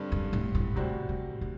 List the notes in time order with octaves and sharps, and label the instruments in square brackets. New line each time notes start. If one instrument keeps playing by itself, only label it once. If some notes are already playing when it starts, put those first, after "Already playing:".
Already playing: [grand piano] G2 D3 G3 C4
[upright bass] F#2
A2
A2
[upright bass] A2 [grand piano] C3 G3 C4 F#4
[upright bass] A2
A2